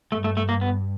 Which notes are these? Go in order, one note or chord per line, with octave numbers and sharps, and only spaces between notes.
G2 A3
A3
A3
A#3
B3